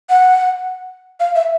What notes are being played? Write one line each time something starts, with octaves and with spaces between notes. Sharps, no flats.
F#5
F5
E5